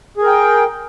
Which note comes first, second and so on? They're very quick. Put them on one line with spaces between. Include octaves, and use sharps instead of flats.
G#4 A#4 G5